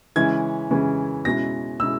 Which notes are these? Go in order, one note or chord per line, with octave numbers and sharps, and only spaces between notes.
C#3 E3 G#3 C#4 E4 G#6
C#3 E3 G#3 C#4 E4
B2 G#3 C#4 E4 A#6
B2 G#3 C#4 E4 E6